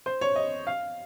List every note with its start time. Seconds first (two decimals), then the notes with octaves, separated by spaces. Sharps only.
0.06 C5
0.21 C#5
0.36 D#5
0.67 F5